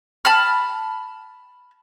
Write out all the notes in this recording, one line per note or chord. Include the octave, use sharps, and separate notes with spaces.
A5 B5 F6